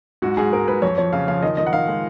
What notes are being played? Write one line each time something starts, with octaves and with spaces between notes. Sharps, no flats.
G#2 F#4
G#2 G#4
G#2 A#4
G#2 B4
F2 C#5
F3 C#5
C#3 F5
F3 F5
D#3 D#5
D#3 D#5
F#5
D#3 F5
G#3